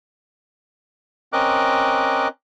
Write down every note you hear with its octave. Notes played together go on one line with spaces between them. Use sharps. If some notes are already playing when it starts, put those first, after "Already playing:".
C4 C#4 A#4 D#5 D6 F#6